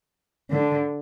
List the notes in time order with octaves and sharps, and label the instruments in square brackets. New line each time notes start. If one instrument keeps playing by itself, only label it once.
[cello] D3